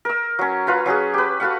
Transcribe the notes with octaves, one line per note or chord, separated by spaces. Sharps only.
A#4 E6
F#3 C#4
F4 B4 A#5
F#3 C#4 F#4 G#4
G4 B4
F#4 A4 F5 F#5